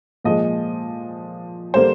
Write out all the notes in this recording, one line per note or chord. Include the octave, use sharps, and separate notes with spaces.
A#2 F3 G#3 D#5
D3 G3 A#3 C5